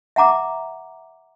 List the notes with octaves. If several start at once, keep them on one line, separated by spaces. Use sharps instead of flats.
E5 F#5 A#5 D6